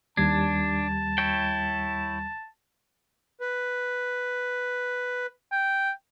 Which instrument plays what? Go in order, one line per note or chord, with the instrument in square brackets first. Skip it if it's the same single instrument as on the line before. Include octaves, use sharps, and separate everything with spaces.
[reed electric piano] D#2 G3 G#6 [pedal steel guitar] D4 [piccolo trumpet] A5
[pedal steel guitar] E4 C#5 G5
[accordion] B4
[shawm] G5